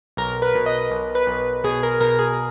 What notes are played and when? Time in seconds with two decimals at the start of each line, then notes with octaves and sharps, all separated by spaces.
0.17 B1 A#4
0.42 B4
0.55 B2
0.66 D#5
0.91 B1
1.15 B4
1.27 B1
1.64 B2 G#4
1.83 A#4
2.01 B2 A#4
2.19 G#4